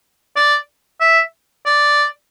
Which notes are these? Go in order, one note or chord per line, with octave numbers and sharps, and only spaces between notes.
D5
E5
D5